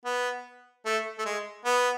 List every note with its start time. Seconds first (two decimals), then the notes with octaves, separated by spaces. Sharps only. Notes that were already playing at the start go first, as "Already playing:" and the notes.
0.05 B3
0.85 A3
1.18 A3
1.25 G#3
1.65 B3